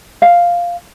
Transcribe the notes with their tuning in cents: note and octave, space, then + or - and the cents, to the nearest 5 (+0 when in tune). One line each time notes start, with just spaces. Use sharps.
F5 +0